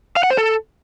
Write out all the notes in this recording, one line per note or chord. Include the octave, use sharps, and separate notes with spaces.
F5
F#5
C5
A4